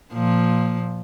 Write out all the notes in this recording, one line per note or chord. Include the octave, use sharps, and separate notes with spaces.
A#2 F3